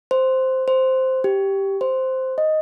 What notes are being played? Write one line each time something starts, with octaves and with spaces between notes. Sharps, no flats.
C5
C5
G4
C5
D#5